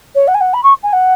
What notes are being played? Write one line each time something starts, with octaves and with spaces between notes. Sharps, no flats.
C#5
F#5
G#5
F#5
B5
C#6
G#5
F#5